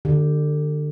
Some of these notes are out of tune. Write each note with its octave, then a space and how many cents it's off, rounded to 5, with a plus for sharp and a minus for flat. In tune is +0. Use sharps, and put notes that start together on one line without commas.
D3 +30 G4 +0